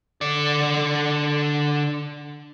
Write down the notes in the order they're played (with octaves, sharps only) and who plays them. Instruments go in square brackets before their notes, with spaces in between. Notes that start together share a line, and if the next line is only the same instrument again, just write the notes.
[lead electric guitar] D3 D5